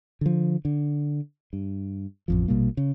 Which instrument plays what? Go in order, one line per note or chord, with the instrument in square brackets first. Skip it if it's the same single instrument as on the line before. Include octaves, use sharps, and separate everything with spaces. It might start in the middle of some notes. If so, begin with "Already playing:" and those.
[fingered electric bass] D3 F3
D3
G2
A1 F2 F3
A#1 B2 G3 A#3
C#3